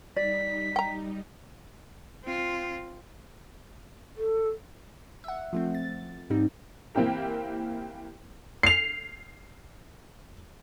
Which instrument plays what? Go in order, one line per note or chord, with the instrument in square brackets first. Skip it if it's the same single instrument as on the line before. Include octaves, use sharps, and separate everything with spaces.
[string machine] G3 D#4 [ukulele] D5 [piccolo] B6
[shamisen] G5 A#5
[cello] C4 F4
[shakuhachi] A4
[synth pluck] E5 F#5
F3 A3 C4
A6
G#2 G3 C4 D#4
[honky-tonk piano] E3 A#3 C4 E4 G4 A#4
C7 F7